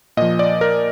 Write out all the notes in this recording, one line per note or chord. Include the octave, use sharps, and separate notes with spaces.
A#2 F3 D#5
D5
A#4